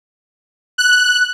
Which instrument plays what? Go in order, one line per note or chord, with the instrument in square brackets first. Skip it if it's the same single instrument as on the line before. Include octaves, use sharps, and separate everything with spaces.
[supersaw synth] F#6